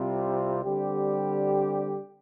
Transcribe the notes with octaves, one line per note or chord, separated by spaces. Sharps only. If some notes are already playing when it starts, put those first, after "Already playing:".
Already playing: C2 C3 G3 C4 F4
D3 G3 C4 G4